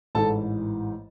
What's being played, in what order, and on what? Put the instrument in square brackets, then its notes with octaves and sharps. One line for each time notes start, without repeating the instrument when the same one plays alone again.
[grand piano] A1 G#2 E3 A4 A5